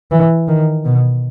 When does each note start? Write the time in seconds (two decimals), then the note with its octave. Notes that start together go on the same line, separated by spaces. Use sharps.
0.11 E3
0.48 D#3
0.85 B2